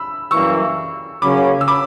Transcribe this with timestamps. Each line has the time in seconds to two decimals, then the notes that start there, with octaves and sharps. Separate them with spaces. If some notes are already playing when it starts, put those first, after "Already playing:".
Already playing: B5 E6
0.31 F#2 E3 G3 A#3 C#6 E6
1.22 C#3 F#3 A#3 C#4 B5 D6
1.61 E6
1.68 B5 D6